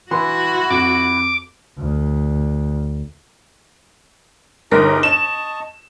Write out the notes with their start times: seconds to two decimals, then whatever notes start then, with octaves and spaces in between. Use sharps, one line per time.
0.11 E3 E4 F#4 F#5 C6
0.70 F2 D6
1.79 D2
4.71 G1 D#4 G4 G#4 A#4 A#6
5.03 D#5 A5 C#6 E7